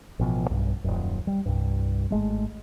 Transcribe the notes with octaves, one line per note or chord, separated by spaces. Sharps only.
A1 B2 F3
B1 G2
D#1 G#1 F#2
G3
C2 G2
G#1 G#3 A3